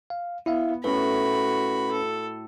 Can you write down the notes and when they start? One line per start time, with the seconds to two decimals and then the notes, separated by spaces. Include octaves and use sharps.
0.10 F5
0.46 B3 E4 E5 F5
0.84 A2 C#4 F#4 B4 B5
1.91 A4